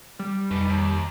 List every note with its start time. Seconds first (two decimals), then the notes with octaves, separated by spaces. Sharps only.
0.19 G3
0.51 F2 D#4 B4
0.68 D#2